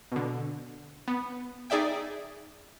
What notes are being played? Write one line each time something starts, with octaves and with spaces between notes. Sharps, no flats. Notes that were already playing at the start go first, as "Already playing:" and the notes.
B2 D3
B3
D#4 G#4 D5 E5 G5